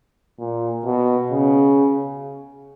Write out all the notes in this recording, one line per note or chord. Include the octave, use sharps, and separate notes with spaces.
A#2
B2
C#3